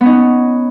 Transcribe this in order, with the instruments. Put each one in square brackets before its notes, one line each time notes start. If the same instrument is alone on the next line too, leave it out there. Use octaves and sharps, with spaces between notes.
[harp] B3
C#4
D#4